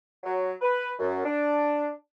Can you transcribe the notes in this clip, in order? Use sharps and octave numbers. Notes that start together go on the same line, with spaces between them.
F#3
B4
F#2
D4